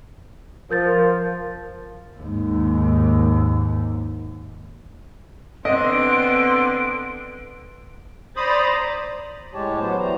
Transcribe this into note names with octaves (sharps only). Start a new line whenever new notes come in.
F3 A#4 G6 A6
D#2 G#2
D3 B3 C4 D#5 C6 D7
C5 D5 A#5 B5 D#6 A6
A2 G#3 G4 C#5 A5
F#3 B3 C5
A2 E3 G3 C5 A#5